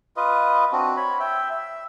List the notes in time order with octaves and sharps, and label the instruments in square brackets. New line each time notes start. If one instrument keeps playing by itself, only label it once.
[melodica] F4 B4 D#5
C4 D4 F#4
C#5 B5
E5 G5
E5